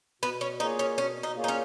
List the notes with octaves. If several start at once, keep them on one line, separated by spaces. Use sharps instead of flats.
B2 B3
C#4
A#3 D#4 F4 G#4 C#5
C#4
B2 C#4
D#4
A#3 F4 G#4 C#5
D#4
C#4